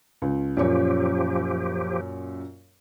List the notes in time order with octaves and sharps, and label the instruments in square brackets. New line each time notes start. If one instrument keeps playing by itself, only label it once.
[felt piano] C#2
[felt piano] F#2 A#2 C#5 [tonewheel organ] F3 G4